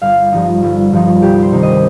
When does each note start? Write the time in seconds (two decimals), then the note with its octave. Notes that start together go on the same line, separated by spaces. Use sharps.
0.02 G1 F5
0.32 G2 F3 D#4
0.62 G1
0.93 G2 F3 D#4
1.22 C2 G4
1.43 C5
1.52 C3 D#3 C4 D#4
1.63 D#5